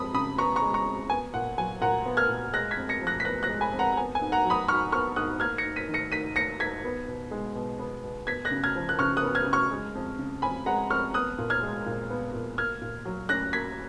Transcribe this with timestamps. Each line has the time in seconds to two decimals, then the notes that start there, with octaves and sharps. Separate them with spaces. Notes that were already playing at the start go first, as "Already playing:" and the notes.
Already playing: F2 G#3 B5 D#6
0.14 C#3 B5 D#6
0.38 B3 A#5 C#6
0.56 A#5 C#6
0.62 G#3
0.74 A#5 C#6
0.85 F2
1.10 B3 G#5
1.34 A#2 F#5
1.58 F#3 G#5
1.81 A#2 F#5 A#5
2.06 B3
2.17 F6 G#6
2.29 A#2
2.53 G#3 F#6 A#6
2.71 G#6 B6
2.77 F2
2.89 A#6 C#7
3.01 F3
3.07 F#6 A#6
3.20 B6
3.25 B3 F#6 A#6
3.43 F#6 A#6
3.49 G#3
3.61 G#5 B5
3.73 F2
3.79 F#5 A#5
3.97 B3 G#5
4.15 G#5
4.21 G#2
4.32 F#5 A#5
4.44 F#3
4.50 B5 D#6
4.68 G#2 C#6 F6
4.92 B3 C#6 F6
5.16 G#2 D#6 F#6
5.40 A#3 F6 G#6
5.58 A#6 C#7
5.65 G#2
5.76 B6 D#7
5.88 D#3
5.94 A#6 C#7
6.12 G#2 B6 D#7
6.36 A#3 A#6 C#7
6.60 G#2 G#6 B6
6.84 B3
7.08 B2
7.31 G#3
7.55 B2
7.79 B3
8.04 B2
8.27 B3 G#6 B6
8.45 F#6 A#6
8.51 C#3
8.63 F6 G#6
8.75 F3
8.89 F#6
8.99 C#3 C#6 F6
9.17 D#6 F#6
9.23 B3
9.35 F6 G#6
9.47 C#3
9.53 C#6 F6
9.71 G#3
9.95 F2
10.18 C#3
10.42 F2 G#5 B5
10.66 G#3 F#5 A#5
10.90 F2 C#6 F6
11.14 B3 D#6 F#6
11.38 A#2
11.50 F6 G#6
11.63 G#3
11.86 A#2
12.10 B3
12.33 A#2
12.58 A#3 F6 G#6
12.82 A#2
13.05 F#3
13.29 C#4 F#6 A#6
13.53 A#3 G#6 B6